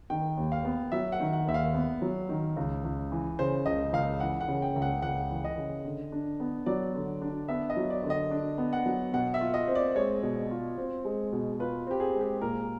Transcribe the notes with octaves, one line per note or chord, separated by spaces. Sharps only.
D#3 G5
D#2
F5
B3
F#3 E5
F#5
D#3
F#5
D#2 E5
F5
B3
F#3
D#3
C#2
C#2
E3
C#3 C5
C#2 D#5
C#2 F5
E3 F#5
F#5
C#3
G5
C#2
F#5
C#2 F#5
E3
D#5
C#3
D3
D4
B3
F#3 D5
D3
D4
B3 E5
D#5
F#3
D5
D3
D#5
D4
B3
F#5
F#3
B2 F#5
E5
F4
D#5
C4
D5
G#3 C#5
B2
F4
C4
G#3
B2
F4 B4
C4 G4
G#4
G#3
G4
A#2 A#4